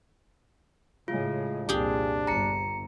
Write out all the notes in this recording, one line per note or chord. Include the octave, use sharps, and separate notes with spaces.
A2 C#3 G#3 F4
C2 F2 A#2 D4 G4 G#4
G1 A#5 C#7